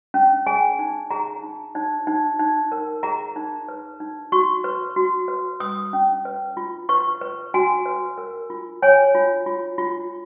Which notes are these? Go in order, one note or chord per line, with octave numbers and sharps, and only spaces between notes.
C#4
G#4 G#5
D#4
G#4 A#5
D#4
D#4
D#4
D#4
A#4
G#4 A#5
D#4
B4
D#4
F#4 C#6
B4
F#4
B4
B4 D#6
C#4
B4
F4
B4 C#6
B4
F#4 G#5
B4
A#4
F4
C#5 G#5
F4
F4
F4